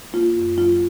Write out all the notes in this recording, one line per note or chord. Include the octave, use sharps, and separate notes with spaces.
A#3 F4
F#2
F#3 F4